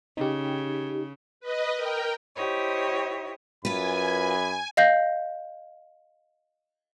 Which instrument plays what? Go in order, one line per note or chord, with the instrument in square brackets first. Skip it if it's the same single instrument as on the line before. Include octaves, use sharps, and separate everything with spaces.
[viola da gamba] C#3 [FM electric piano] D#4 G4
[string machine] B4 D#5
A#4 G5
[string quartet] E4 G4 C5 C#5 D#5
[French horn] F#2 [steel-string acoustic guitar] F4 B4 [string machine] G#5 [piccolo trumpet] B5
[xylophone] D#5 F5 G6 A#6